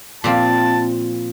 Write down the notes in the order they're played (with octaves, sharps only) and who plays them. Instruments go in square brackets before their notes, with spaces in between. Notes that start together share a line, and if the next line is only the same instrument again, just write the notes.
[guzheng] A#2 F3 C4 [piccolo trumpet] A5